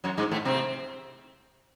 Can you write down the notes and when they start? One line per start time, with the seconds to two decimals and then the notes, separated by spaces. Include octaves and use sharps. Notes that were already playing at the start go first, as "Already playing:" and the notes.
0.04 F#2 F#3
0.17 G#2 G#3
0.31 A2 A3
0.45 C3 C4